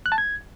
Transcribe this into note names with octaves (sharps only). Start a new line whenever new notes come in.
F#6
A5
G#6